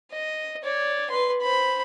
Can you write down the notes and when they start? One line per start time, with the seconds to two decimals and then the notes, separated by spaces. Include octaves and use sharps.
0.12 D#5
0.64 C#5 D5
1.11 B4 C6
1.41 C5 B5